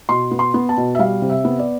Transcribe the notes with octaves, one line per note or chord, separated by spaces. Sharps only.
B2 C6
B3
C6
B3
A5
B2
E5
G3 F5
C3
E5
B3
D5